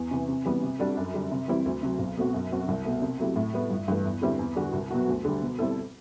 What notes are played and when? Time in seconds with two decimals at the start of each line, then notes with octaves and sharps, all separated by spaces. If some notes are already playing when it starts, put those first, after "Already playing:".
Already playing: E2
0.11 C3 E3
0.29 C3
0.45 E3 G3 B3
0.63 C3
0.79 G3 D4 F#4 A4
0.97 F#2
1.14 D3 G3
1.32 C3
1.48 E3 G3 C4 E4
1.66 D2
1.83 C3 F#3
1.99 B1
2.17 B2 A3 C4 F#4
2.34 F#2
2.50 F#3 C4 F#4
2.68 C2
2.85 B2 A3
3.02 C3
3.19 F#3 A3 E4 G4
3.36 A2
3.53 G3 B3
3.70 G1
3.88 G2 E3 A3
4.05 E2
4.22 D3 G3 C4 E4
4.39 E2
4.56 D3 G3 D4 F#4
4.73 C2
4.91 B2 F#3 B3 F#4
5.08 D2
5.25 D3 G3
5.41 B2
5.59 G3 C4 E4 A4